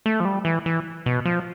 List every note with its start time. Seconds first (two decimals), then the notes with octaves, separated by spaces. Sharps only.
0.06 A3
0.20 F3
0.25 G3
0.45 E3
0.66 E3
1.06 B2
1.25 F3